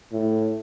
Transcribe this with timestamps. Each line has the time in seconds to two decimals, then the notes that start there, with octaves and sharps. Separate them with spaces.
0.12 A2